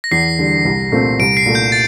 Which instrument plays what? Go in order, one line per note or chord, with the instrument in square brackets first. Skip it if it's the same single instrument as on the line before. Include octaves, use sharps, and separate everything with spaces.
[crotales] A#6
[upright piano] E2 [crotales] C7
[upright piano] D3 G3
C2
A#2 A3 C4
[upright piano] C2 [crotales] D7
[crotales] C7
[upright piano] A#2 A3
[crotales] G6
A6